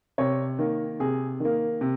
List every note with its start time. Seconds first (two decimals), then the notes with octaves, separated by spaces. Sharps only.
0.18 C3 C#5
0.59 D#3 A#3
1.00 C3 G#4
1.40 D#3 A#3
1.81 C3